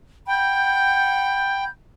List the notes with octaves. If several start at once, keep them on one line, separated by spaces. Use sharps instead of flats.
F#5 G5 B5 G6